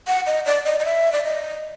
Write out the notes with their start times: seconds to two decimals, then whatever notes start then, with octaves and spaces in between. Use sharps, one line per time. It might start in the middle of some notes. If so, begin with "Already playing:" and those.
0.07 F#5
0.26 D#5
0.46 D5
0.65 D#5
0.80 D#5
0.85 E5
1.12 D5
1.24 D#5